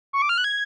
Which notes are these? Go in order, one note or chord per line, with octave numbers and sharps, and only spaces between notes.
C#6
D6
F6
F#6
G#6